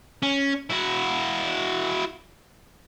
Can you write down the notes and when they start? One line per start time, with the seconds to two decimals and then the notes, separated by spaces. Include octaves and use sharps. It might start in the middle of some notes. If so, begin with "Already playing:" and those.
0.23 C#4
0.70 E4 F#4